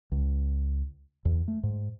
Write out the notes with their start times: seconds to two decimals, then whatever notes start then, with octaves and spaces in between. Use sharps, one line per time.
0.12 C#2
1.25 E2
1.48 A3
1.63 G#2